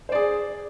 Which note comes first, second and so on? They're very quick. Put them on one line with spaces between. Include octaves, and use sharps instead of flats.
C5 D5 G#4